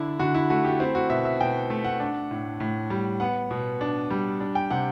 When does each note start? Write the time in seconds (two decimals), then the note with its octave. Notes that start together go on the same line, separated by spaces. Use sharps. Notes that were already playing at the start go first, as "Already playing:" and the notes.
Already playing: D3 D4 E4
0.19 D3 F#4
0.34 E4
0.50 A3 F#4
0.65 G4
0.80 C4 E4
0.95 F#4
1.10 B2 E5
1.25 E5
1.41 B2 G5
1.70 A3
1.84 F#5
2.00 D4
2.31 A2
2.60 A2
2.90 G3
3.20 B3 F#5
3.51 B2
3.81 D4
4.11 G3
4.40 D4
4.55 G5
4.70 C3 F#5